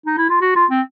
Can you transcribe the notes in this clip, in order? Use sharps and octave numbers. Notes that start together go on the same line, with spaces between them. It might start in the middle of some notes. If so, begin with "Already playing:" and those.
D#4
E4
F4
F#4
F4
C4